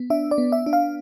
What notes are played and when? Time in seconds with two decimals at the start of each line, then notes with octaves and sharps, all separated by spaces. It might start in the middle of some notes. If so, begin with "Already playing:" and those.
Already playing: B3
0.10 D4 E5
0.31 D5
0.38 B3
0.52 E5
0.66 D4
0.73 F5